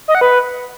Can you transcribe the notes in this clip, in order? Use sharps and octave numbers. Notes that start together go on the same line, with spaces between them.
D#5
F#5
B4